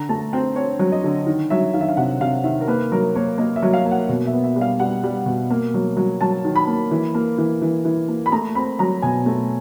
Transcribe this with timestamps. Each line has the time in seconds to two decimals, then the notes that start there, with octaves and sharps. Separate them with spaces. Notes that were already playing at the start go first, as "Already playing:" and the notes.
Already playing: D3 A#5
0.09 A3 A5
0.33 C4 G5
0.56 C4 C#5
0.79 F#3
0.92 D#5
1.04 D3
1.27 D#3
1.50 F#3 E5
1.74 D#3 F5
1.81 E5
1.89 F5
1.97 C3 F#5
2.21 C3 F5
2.44 D#3 E5
2.61 A#4
2.68 A#3 B4
2.92 F#3 A#4
3.15 A#3 C#5
3.38 A#3 D#5
3.56 E5
3.62 F#3
3.74 F5
3.85 A#3
3.91 F#5
4.09 B2
4.27 E5
4.33 B3
4.44 E5
4.56 G3
4.61 F5
4.80 G3 F#5
5.04 G3
5.26 B2
5.50 A#3
5.74 F#3
5.97 F#3
6.21 F#3 A5
6.45 D#3
6.56 B5
6.67 A#3
6.91 E3
7.15 A#3
7.38 E3
7.62 E3
7.85 E3
8.08 A#3
8.26 B5
8.32 A3 A#5
8.55 C4 B5
8.79 F#3 A#5
9.02 B2 G#5
9.26 A3